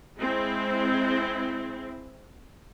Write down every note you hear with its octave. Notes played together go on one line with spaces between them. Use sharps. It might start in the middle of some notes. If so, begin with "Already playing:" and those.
G#3 C4 E4